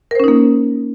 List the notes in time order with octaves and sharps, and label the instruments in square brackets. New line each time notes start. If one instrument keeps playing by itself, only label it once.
[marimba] A#4
C5
C#4
D#4
A#3